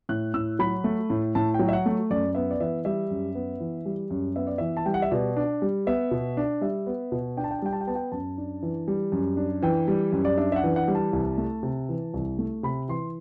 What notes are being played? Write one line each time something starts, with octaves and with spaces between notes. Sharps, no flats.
A2 F#6
A2 E6
F#3 B5
A3
A2
A2 A5
G5
F#3
E5
F#5
A3
F#2 D5
B3 E5
D5
E3 E5
G3 E5
F#2
B3
E3
G3
F#2
B3 E5
D5
E3 E5
A5
G3 G5
F#5
E5
B2 D5
D4
G3
B3 E5
B2
D4
G3 E5
B3
B2
D4 G5
A5
G5
A5
G3 G5
A5
G5
B3 A5
G5
F#2 A5
D4
E3
G3
F#2
D4
E3 G5
G3
F#2
D5
D4 E5
E5
F#5
E3
F#5
G3
A5
C2
A3
C3
E3
C2
A3
C3 B5
E3 C6